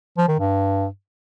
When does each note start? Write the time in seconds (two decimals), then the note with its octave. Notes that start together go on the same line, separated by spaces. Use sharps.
0.18 F3
0.29 D#3
0.39 G2